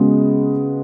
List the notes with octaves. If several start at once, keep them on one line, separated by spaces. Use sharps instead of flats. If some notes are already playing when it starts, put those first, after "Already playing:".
Already playing: C#3 G#3 B3 F#4